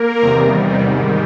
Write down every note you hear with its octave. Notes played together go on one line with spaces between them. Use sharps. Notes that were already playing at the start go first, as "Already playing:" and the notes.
Already playing: A#3 A#4
E2 C3 D#3 G3
G#2 D#3 G3